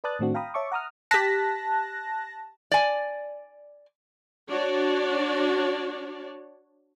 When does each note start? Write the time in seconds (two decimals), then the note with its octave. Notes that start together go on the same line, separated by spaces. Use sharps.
0.04 B4 D5 A5 D#6 F#6 A6
0.19 A2 D#3 A3 C4 D4 F#4
0.34 F5 G5 A#5 B5 D#6
0.54 C#5 E5 A5 C#6 D6
0.72 F#5 A#5 D#6 F6
1.11 G4 A5 F#6 A#6 B6
2.71 D5 G#5
4.50 D4 F#4 C#5 D5